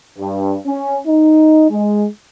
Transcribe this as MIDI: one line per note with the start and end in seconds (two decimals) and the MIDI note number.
0.18 0.56 43
0.66 0.99 61
1.07 1.67 63
1.70 2.07 56